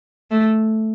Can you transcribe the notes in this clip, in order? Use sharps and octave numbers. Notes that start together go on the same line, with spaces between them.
A3